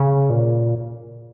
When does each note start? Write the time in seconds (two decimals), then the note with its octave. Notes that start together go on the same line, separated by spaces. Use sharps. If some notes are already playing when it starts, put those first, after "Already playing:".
Already playing: C#3
0.30 A#2